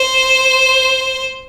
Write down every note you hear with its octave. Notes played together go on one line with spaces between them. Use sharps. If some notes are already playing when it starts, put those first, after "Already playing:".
Already playing: C5